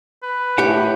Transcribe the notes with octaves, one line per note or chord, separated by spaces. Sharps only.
B4
A2 G4 F#5